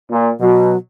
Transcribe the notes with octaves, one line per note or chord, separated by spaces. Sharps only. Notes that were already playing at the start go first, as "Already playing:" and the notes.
A#2
B2 F#3